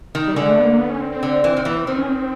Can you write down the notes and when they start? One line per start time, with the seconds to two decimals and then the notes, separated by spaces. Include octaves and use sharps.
0.15 D#3
0.27 G3
0.36 D3 G#3
0.50 A3
0.60 B3
0.64 A#3
0.79 B3
0.90 C#4
1.01 C4
1.12 C4
1.23 D3
1.44 E3
1.57 D#3
1.65 E3 B3
1.76 C4
1.87 D#3 C4
1.98 C#4
2.09 C4